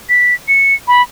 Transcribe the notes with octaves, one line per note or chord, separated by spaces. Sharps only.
B6
C#7
B5